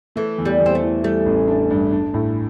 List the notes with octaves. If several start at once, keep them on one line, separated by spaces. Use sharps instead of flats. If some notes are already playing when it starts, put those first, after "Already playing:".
E3 A3
E2
G3
E2
C4
A3
E3
G3 A3
A1
D4
G2
D4
A2